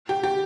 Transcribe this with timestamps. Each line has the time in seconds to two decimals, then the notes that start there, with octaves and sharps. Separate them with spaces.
0.09 G4
0.23 G4